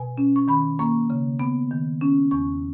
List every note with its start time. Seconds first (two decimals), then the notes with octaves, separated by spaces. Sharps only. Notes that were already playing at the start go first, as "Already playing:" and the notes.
Already playing: B2 G#5
0.18 C#4
0.36 C#6
0.48 D#3 B5
0.79 A#3 C#6
1.10 C#3
1.40 B3
1.71 D#3
2.01 C#4
2.31 E2 C#6